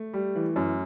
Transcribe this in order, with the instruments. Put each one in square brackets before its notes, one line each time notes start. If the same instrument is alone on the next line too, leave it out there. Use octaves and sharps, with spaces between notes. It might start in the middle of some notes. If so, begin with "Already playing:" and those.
Already playing: [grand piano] A3
[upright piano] G3
E3
F#2